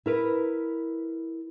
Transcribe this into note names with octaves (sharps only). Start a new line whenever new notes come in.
E4 A#4 B4